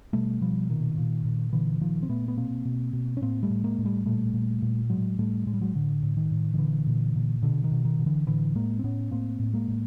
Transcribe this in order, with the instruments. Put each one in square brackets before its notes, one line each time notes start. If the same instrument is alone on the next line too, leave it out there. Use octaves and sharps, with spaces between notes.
[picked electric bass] B2 G3 A3
B2 F3 G3
A#2 D#3
A#2
A#2
A#2 D3 E3
A#2 D#3 F3
C4
A#2 A3 B3
B3
B2 A#3 C4
B2
B2
C#4
A2 A#3 C4
G3 A3
A2
G#3 A#3
A2
G3 A3
A#2 G3 A3
A#2
A#2
A2 F#3 G#3
A2 G3 A3
A2 G#3
G3
F#3 G#3
A2 D3
A2
D#3
A2
D#3
A#2 D3 E3
A#2
A#2
B2 D3
D#3
B2
D#3
B2
D3 E3
A2 D3 E3
A2 G#3 A#3
C4
A2 B3 C#4
A2 A#3 C4
A2
G#3 A#3
A2